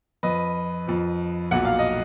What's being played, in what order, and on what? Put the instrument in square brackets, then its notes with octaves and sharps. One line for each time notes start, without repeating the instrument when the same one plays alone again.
[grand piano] F2 F3 B4 D#5
F2 F3
B1 A#2 F#3 F#5
F5
D#5